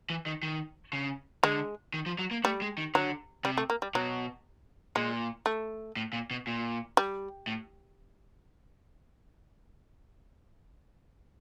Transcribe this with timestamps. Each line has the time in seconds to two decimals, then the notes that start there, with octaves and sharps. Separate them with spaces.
0.10 E3
0.26 D#3
0.43 D#3
0.93 C#3
1.43 D3 G#3
1.94 D#3
2.06 F3
2.19 F#3
2.31 A#3
2.44 G3 A3
2.62 G#3
2.78 D#3
2.95 D3 F#3
3.44 C3 G3
3.57 A3
3.70 A#3
3.82 G3
3.95 B2 F#3
4.96 A#2 G#3
5.46 A3
5.97 A2
6.13 A#2
6.31 B2
6.47 A#2
6.97 G3
7.47 A2